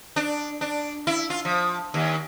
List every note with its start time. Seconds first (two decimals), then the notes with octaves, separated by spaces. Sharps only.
0.16 D4
0.61 D4
1.07 E4
1.30 F4
1.45 F3
1.94 D#2